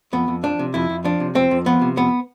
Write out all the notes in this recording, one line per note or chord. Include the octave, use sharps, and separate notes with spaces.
F2 B3
F2
F3 D4
C3
F2 E4
F2
F3 D4
C3
F2 C4
F2
F3 B3
C3
F2 B3